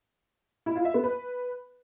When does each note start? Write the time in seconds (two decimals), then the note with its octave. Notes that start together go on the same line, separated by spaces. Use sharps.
0.66 E4
0.76 F4
0.85 E5
0.94 B3
1.04 B4